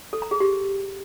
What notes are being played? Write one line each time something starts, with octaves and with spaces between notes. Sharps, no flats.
A4
A#5
G#4
G4